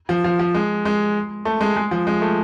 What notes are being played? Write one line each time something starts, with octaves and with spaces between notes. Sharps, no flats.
F3
F3
F3
G#3
G#3
A3
G#3
G#3
F3
G#3
A3